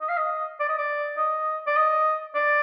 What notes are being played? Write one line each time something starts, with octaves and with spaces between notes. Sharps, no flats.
D#5
F5
D#5
D5
D#5
D5
D#5
D5
D#5
D5